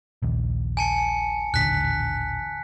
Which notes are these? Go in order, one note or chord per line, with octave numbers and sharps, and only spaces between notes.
A#1 D#2
G#5 A5 C#7
D#1 A1 D3 F#6 B6